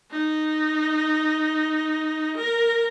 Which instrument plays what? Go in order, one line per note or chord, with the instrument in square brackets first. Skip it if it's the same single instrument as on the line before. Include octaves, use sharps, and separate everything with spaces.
[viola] D#4
A#4